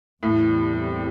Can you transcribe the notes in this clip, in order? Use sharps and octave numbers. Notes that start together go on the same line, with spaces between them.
E2 A2 C3 E3 G3